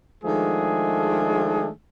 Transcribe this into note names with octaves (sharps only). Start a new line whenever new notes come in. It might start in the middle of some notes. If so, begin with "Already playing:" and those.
D#3 F3 G#3 A3 D4 G#4